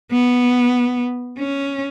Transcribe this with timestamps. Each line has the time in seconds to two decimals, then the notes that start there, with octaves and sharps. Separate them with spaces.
0.12 B3
1.39 C#4